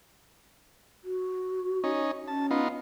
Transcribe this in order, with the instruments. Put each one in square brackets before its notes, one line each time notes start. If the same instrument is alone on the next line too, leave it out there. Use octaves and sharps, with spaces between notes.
[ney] F#4
[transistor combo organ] C#4 D#4
[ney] C#4 [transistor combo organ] A5
[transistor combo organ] B3 D#4 F4